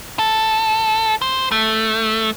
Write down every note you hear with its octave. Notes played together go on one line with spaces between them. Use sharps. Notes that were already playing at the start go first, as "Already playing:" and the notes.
A4
C5
A3